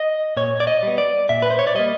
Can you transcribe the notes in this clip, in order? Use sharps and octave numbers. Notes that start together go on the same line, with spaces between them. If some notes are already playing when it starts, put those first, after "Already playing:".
Already playing: D#5
A#2 C#5
D5
D#5
G3 B3
D5
A#2 E5
B4
C5
C#5
D5
G3 A#3 D#5